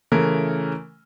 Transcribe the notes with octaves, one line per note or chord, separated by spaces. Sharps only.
C#3 E3 A3 A#4